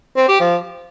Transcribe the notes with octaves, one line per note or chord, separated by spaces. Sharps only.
C4
G4
F3